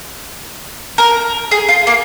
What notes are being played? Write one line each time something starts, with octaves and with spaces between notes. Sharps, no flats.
A#4
G#4
F4
A#3